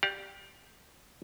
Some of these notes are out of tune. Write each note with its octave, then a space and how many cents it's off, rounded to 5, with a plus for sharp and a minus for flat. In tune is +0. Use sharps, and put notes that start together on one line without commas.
G4 +0 D5 +5 F5 +35